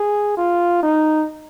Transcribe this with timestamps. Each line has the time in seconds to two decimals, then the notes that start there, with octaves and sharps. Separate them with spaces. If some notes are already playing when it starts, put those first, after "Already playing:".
Already playing: G#4
0.37 F4
0.83 D#4